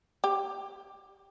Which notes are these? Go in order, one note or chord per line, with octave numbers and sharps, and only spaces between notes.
G4